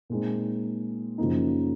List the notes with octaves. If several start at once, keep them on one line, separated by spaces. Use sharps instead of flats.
A#2 G#3 C4 D#4
F#2 C#3 F3 A#3 D#4